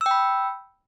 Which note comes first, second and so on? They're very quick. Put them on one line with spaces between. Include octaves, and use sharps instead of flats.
E6 G5 B5